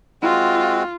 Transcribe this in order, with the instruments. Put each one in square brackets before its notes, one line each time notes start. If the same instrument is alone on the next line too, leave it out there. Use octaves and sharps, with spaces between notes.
[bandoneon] G#3 C4 F#4 [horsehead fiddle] F4